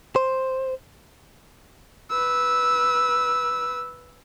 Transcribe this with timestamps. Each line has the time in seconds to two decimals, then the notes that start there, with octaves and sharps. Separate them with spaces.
0.16 C5
2.11 B4 E6